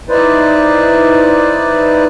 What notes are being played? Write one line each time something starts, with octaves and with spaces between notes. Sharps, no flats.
D#4 E4 B4 C5 D5